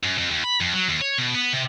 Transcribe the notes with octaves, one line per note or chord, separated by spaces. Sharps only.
F#2
F2
D#2
B5
F2
F#3
D#2
C#5
B2
B3
C3